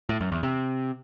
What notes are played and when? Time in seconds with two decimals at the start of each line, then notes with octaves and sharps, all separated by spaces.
0.09 A2
0.21 F#2
0.32 E2
0.43 C3